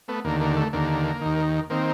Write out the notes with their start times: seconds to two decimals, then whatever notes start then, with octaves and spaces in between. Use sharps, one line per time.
0.08 A3 B3
0.24 D#2 D3 A#3
0.41 A#3
0.57 A3
0.73 D#2 D3 A#3
1.21 D#2 D#3
1.70 D#3 A#3 C4